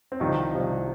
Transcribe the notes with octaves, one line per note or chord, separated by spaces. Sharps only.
C4
C2 C3 D#3 F3 D#4
C2 C3 F3